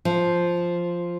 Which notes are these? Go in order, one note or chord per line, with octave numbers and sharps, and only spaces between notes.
F3